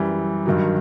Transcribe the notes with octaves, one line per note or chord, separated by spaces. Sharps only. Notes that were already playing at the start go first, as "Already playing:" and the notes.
Already playing: F#2 E3 G3
G2 D#3 F#3